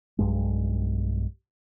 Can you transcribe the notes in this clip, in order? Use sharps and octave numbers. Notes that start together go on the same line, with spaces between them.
B1 G2 G#3